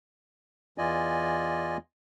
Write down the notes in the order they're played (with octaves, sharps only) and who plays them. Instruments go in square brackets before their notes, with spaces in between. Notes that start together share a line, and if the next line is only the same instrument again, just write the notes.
[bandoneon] E2 E3 F4 D5 D#5 G#5